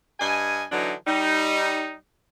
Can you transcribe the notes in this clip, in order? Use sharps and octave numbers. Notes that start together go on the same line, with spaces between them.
G2 D#5 G#5
D3 E3 F#3 D4 D#4
G3 D#4